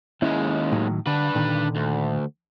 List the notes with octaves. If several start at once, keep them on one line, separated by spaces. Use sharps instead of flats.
D#2 G#3 C#4 E4
A2 D#3 F#3
D3 D4 B4
A#2 D3 D#3
D2